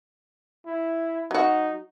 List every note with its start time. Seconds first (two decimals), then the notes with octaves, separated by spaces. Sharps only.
0.66 E4
1.31 F#3 D#4 F#4